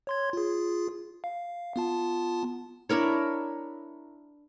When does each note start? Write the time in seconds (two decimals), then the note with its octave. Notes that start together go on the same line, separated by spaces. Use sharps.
0.07 C#5 C6 G#6
0.33 F4 G#4
1.24 F5
1.76 B3 F4 A5
2.89 D4 E4 A#4 C#5